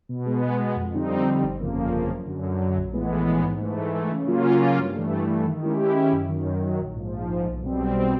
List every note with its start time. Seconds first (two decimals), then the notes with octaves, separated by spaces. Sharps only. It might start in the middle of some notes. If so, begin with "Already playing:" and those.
0.09 B2
0.26 G#3 B3
0.42 B2
0.59 G#3 B3
0.76 F2
0.93 D3 G3 C4 D#4
1.09 F2
1.26 D3 G3 C4 D#4
1.43 G1
1.60 F2 C#3 F3 A#3
1.76 G1
1.93 F2 C#3 F3 A#3
2.10 F#2
2.26 D3 F#3
2.43 F#2
2.60 D3 F#3
2.77 A#1
2.93 A2 E3 G#3 B3
3.10 A#1
3.27 A2 E3 G#3 B3
3.44 G#2
3.61 E3 A3
3.77 G#2
3.95 E3 A3
4.11 C#3
4.28 F#3 A#3 C#4 F4
4.44 C#3
4.61 F#3 A#3 C#4 F4
4.78 G2
4.95 E3 A3
5.11 G2
5.28 E3 A3
5.45 D#3
5.62 G#3 C#4 E4 G4
5.78 D#3
5.95 G#3 C#4 E4 G4
6.12 F#2
6.29 D#3 F#3
6.45 F#2
6.62 D#3
6.67 F#3
6.79 A#1
6.96 G#2 F3
7.13 A#1
7.29 G#2 F3
7.46 B1
7.62 B2 G3 C4
7.80 B1
7.96 B2 G3 C4